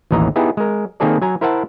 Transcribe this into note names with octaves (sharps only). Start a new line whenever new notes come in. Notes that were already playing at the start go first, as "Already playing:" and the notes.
A1 D#2 E3 D#5 A#5
B3 D#4 E4 G4 G#4
G#3 A#4
D#3 A#3 C4 G#4 A4 D5
F#3 G#5 A#5
E4 A#4 C5 E5 F#5 A5